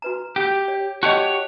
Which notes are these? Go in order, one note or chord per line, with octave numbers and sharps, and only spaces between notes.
F#4 B4 A#5
G4
C#5
F#4 G4 C#5 D#5 G5 A5